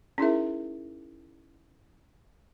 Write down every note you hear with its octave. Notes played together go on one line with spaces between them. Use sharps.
C#4 D#4 E4 G#4 A#4 E5